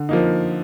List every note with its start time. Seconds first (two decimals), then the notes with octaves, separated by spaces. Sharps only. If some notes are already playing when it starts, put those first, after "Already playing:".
Already playing: D3
0.09 F3 A#3 D#4